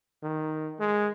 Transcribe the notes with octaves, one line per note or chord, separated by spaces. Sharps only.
D#3
G#3